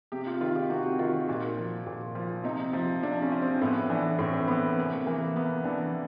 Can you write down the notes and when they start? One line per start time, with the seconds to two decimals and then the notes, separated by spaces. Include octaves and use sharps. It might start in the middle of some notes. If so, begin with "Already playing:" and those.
0.12 C3 G4
0.27 F4
0.41 D#3 F4
0.55 G4
0.69 C3 F#4
0.99 D#3 F4
1.28 A#2 F#4
1.57 F3
1.86 A#2
2.15 F3
2.44 C3 D#4
2.73 F3
3.03 C3 D4
3.22 C#4
3.32 F3
3.42 C4
3.61 A2 B3
3.90 E3 D4
4.19 A2 C4
4.48 E3 B3
4.77 C3 A#3
5.06 E3 A#3
5.35 C3 B3
5.64 E3 D4